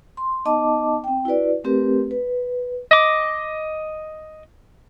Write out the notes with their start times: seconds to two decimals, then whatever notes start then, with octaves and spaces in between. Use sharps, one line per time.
0.17 C6
0.45 B3 D#4 D#5 A5 D6
1.04 C4 G5
1.25 E4 F#4 B4 D5
1.64 A3 C4 G4 A#4 B4
2.11 B4
2.91 D#5 D6